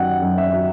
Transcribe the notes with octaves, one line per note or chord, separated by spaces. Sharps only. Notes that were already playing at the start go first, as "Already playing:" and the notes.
Already playing: F#2 D#3 F#3 F#5 G5
F#2
E5
F#3